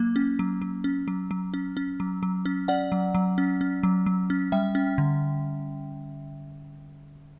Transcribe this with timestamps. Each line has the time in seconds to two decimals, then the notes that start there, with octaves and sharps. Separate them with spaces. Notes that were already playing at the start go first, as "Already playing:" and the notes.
Already playing: F#3 A#3
0.16 C#4
0.39 F#3
0.62 F#3
0.84 C#4
1.08 F#3
1.31 F#3
1.54 C#4
1.77 C#4
2.00 F#3
2.23 F#3
2.45 C#4
2.68 C#4 D5 F#5
2.92 F#3
3.15 F#3
3.38 C#4
3.61 C#4
3.83 F#3
4.06 F#3
4.30 C#4
4.52 G3 E5 G5
4.75 C#4
4.98 D3